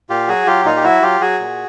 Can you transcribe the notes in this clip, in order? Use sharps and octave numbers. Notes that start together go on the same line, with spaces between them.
A#2 F4 G4
F#3 F#4 G#4
F#3 F4 G4
A#2 D#4 F4
G4
F#3 E4 F#4
F#3 F4 G4
F#3 F#4 G#4
A#2